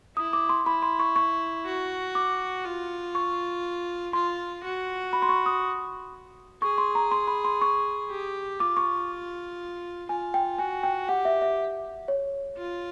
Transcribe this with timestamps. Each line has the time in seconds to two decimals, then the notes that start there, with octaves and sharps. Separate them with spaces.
0.16 E4 D#6
0.33 D6
0.49 C6
0.66 E4 B5
0.82 C6
0.99 C#6
1.16 C#6
1.66 F#4
2.15 D6
2.65 F4
3.15 C#6
4.13 F4 C6
4.63 F#4
5.13 B5
5.22 C6
5.29 C#6
5.46 D#6
6.62 G#4 C#6
6.78 C6
6.95 A#5
7.11 C6
7.27 B5
7.45 C6
7.61 C#6
8.10 G4
8.60 F4 D6
8.77 C#6
10.09 F4 G#5
10.34 G5
10.58 F#4 G#5
10.83 G5
11.09 G4 F#5
11.25 E5
11.42 E5
12.08 C#5
12.58 F4